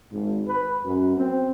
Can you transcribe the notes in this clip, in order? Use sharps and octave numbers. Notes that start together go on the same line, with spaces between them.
G#1
B4
F#2
C4